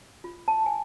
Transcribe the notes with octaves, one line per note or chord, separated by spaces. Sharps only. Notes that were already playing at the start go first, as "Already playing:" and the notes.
F4
A5
G#5